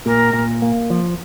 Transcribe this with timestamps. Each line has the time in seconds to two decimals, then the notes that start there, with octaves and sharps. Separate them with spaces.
0.06 A#2 A#4
0.33 A#2
0.62 A#3
0.90 F3